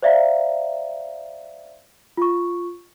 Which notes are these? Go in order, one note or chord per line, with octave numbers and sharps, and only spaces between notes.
C5 D5 E5 F5 A#5
F4 C#6